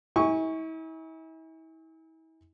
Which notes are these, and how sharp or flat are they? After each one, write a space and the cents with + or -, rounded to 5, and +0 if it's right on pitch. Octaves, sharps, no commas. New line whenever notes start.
E4 -40 G#5 -20 C#6 +0